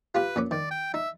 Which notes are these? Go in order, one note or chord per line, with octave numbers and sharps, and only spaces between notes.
F4 G4 B4 F5
A#2 C#4 D6
D#3 D5
G5
D#4 E5